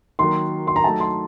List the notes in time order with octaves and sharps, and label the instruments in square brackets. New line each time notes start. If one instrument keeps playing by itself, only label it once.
[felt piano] D#3 F#3 A#3 F#4 [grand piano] C6
[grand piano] C6
A#5
[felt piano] F#3 A3 D#4 [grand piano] A5
[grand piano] C6